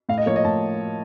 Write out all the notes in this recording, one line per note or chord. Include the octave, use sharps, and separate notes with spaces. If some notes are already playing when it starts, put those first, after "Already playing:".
A2 F5
D#5
F3 A#3 C#5
D#5
A2 A5